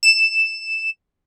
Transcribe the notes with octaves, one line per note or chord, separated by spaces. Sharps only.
E7